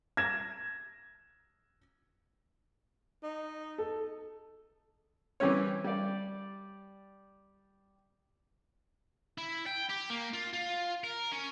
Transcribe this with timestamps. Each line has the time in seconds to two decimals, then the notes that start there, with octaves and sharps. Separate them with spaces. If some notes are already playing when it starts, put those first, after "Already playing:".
0.17 G#6 A#6 E7
3.23 D#4
3.78 A4
5.40 E3 G3 C4 C#4 C#5
5.84 G3 D5
9.38 E4
9.66 G5
9.89 G4
10.10 A#3
10.33 F4
10.53 F4
11.04 A#4
11.32 C#4